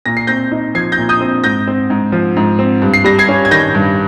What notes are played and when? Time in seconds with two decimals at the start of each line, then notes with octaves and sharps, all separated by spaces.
0.06 A#2 A#6
0.17 C7
0.27 C4 G6 A#6
0.52 D#4
0.75 F3 G#6 C7
0.92 G6 A#6
0.98 A#2
1.09 D#6 G6
1.21 C4
1.44 G#2 G6 A#6
1.67 C4
1.90 G#2
2.12 F3
2.36 G#2
2.59 C4
2.82 G2
2.94 C7
3.04 G3 A#6
3.19 G#6 C7
3.29 C#4
3.45 G#6
3.51 D#3 G6 A#6
3.75 G2